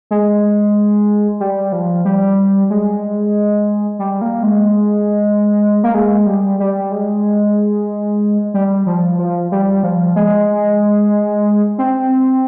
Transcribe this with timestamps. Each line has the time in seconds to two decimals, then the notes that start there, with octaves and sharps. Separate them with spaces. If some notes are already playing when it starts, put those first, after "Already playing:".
0.11 G#3
1.40 G3
1.72 F3
2.05 G3
2.70 G#3
3.99 G3
4.21 A#3
4.43 G#3
5.83 A#3
5.95 G#3
6.26 G3
6.60 G3
6.92 G#3
8.54 G3
8.86 F3
9.18 F3
9.52 G3
9.83 F3
10.16 G#3
11.78 C4